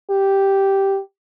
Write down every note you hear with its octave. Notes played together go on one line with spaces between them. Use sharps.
G4